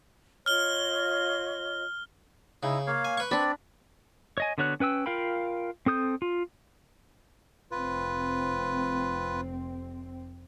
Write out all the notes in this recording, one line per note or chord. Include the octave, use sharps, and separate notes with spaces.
F4 C#5 D#5 F6 G7
C#3 D#4 E4
A#3 C#5 F5
G#5
B4 C#6
C4 D4 D5 B5
C#5 D#5 G#5
D3 B3 F#4 C#5 F#6
C#4 B4 G5 E6
F4 A#4 F5 G5 B5
C4 A4 D#6 G6
F4
F1 C4 F4 B4